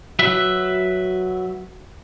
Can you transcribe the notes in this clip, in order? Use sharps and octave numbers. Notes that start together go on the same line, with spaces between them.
F#3 B4 E5